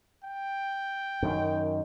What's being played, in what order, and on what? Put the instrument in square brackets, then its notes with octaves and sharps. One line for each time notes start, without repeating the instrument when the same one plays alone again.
[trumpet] G5
[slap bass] F#2 D#3